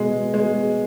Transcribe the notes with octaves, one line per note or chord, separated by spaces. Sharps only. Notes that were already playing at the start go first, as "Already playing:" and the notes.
Already playing: B2 G#3
G#3